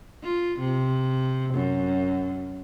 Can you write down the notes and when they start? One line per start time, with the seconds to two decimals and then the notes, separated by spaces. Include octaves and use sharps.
0.23 F4
0.60 C3
1.54 F#2